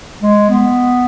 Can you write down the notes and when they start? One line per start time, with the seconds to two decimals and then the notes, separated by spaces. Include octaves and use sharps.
0.22 G#3
0.50 B3